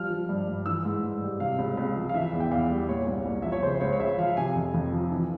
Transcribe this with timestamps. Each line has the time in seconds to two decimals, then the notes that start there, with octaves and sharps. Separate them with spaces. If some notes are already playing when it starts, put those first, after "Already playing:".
Already playing: F3 G3 F6
0.10 F3
0.29 G2
0.48 G2
0.66 E3 E6
0.85 G#2
1.03 G#2
1.22 G3
1.40 C3 F5
1.59 C#2
1.77 C#2
1.96 F3
2.09 F5
2.14 E3 E5
2.33 E2
2.40 G5
2.51 E2 F5
2.70 G3
2.89 A#2 C#5
3.07 C2
3.26 C2
3.42 F3 E5
3.52 C#5
3.62 C#3 C5
3.75 C5
3.81 C#2 C#5
3.92 C#5
4.00 C#2 E5
4.18 F3 F5
4.37 C3 G#5
4.55 F2
4.74 F2
4.92 F3
5.11 E3